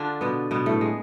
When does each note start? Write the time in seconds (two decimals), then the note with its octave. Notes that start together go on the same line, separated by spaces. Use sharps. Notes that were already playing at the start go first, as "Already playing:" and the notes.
Already playing: D3 D4 F4
0.21 B2 B3
0.51 B2 B3
0.66 A2 A3
0.81 G#3